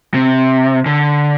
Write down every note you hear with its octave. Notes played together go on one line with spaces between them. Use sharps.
C3
D3